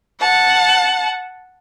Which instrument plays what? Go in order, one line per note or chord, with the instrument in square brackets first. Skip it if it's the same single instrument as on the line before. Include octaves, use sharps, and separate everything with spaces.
[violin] F#5 A5